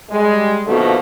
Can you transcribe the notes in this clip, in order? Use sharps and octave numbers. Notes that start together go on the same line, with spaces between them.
G3 G#3
B2 D3 D#3 F3 A3 A#3